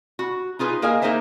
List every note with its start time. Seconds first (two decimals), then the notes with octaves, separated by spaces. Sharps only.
0.19 F#4
0.59 D#4 F4 G#4 B4
0.82 A#3 G#4 A#4 D#5 F5 G#5
1.02 A#3 D#4 G#4 A#4 C5 E5